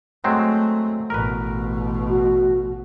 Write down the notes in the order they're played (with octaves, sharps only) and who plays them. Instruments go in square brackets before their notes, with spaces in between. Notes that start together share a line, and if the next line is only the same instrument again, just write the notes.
[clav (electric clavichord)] F#3 G#3 C4 [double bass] A3
[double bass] A1 B2 [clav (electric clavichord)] A#4 B4
[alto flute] F#4